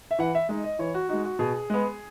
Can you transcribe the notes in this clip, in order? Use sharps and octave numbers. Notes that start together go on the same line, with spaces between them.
E5
E3 F#5
E5
G#3 D#4 D#5
D#5
E3 C#5
F#4
G#3 D#4 F#4
F#4
B2 G#4
G#3 B3